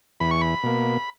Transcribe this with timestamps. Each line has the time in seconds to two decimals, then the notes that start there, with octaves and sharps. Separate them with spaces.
0.20 E2 B5
0.31 C#6
0.41 B5
0.63 B2 A#3